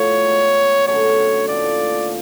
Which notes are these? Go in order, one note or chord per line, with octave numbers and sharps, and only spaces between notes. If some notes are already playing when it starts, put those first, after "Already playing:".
Already playing: A2 F3 B3 C#5
G#3 B3 D#4
D3 F#3 A3 C#4 C#5
A2 F3 A#3 D5